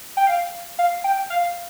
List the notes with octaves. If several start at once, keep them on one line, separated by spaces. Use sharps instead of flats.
G5
F5
F5
G5
F5